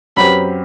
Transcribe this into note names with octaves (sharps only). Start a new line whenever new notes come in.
F#2 F#3 C4 G4 B4 B5